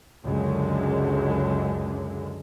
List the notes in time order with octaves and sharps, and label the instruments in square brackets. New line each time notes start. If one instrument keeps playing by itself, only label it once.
[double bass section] C#2 F#2 D3 G#3